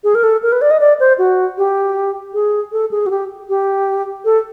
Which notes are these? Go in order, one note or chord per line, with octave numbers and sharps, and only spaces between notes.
G#4
A#4
A4
A#4
B4
D5
D#5
D5
C5
F#4
G4
G#4
A4
G#4
F#4
G4
G4
A4